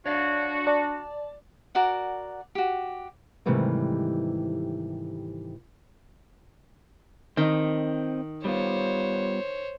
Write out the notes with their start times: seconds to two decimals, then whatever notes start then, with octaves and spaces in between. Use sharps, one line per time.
0.06 D4 F#4 C#5 D5 F5
0.67 D5 A5
1.75 F#4 A#4 D5 F#5
2.55 F#4 G4
3.46 G#2 C3 D#3 E3 G3 A3
7.37 D#3 C4 D#5
8.45 G3 B3 F4 C5 C#5